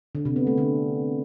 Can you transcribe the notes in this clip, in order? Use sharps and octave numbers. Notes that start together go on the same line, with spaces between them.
D3
C3
B3
A3
D3